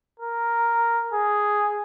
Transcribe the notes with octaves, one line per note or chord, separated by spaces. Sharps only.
A#4
G#4